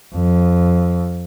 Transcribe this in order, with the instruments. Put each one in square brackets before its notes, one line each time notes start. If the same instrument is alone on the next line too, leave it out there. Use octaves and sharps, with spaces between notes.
[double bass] F2